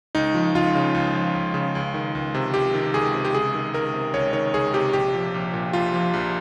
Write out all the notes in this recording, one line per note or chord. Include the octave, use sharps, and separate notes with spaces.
C#2 D#4
F3
C#2 F4
C#3
C#2
F3
C#2
C#3
C#2
D#3
C#2
C3
C#2 G4
D#3
C#2 G#4
C3
G4
C#2 G#4
D#3
C#2 A#4
C3
C#2 C#5
D#3 C#5
C#2 G#4
C3 G4
A#1 G4
F3
A#1
A#2
A#1 F4
F3
A#1